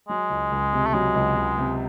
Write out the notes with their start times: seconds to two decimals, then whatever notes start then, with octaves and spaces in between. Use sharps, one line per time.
0.08 F#3 G#3
0.30 C#2
0.51 C#2
0.73 C3
0.86 A3
0.94 F#3 G#3
1.15 C#2
1.36 C#2
1.58 C3